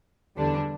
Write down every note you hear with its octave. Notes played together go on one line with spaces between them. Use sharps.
E2 D3 G3 D4